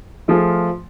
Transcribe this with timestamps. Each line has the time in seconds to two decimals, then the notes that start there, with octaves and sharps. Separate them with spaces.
0.28 F3 A3 F4 G#4